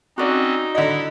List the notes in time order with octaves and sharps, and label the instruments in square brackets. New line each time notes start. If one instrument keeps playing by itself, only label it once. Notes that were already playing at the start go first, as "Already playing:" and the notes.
[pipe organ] C4 C#4 [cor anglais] D#4 [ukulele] F#4 D5
[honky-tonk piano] D3 D#5 [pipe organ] E4